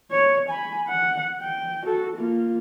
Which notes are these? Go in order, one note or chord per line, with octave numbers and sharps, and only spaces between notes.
C#5
G#5 B5
F#5
G5
F#4 A4
A#3 F4